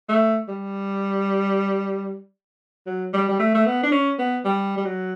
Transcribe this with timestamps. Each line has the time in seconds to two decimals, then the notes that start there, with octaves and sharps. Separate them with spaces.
0.09 A3
0.48 G3
2.87 F#3
3.13 G3
3.29 G3
3.39 A3
3.54 A3
3.66 B3
3.83 D4
3.92 C#4
4.19 B3
4.45 G3
4.77 G3
4.85 F#3